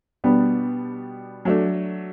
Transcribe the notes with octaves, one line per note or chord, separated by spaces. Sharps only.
B2 G3 B3 D4
F#3 A3 D4